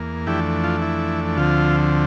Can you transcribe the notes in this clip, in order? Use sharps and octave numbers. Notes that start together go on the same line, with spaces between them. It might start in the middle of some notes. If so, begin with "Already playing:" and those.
Already playing: E2 A#3
F2 E3 A3 D4 E4 G4
F4
E4
D2 D3 F3 C4 F4